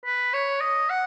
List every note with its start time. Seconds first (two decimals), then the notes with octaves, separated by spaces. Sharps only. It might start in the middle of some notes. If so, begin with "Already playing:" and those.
0.05 B4
0.33 C#5
0.61 D#5
0.89 F#5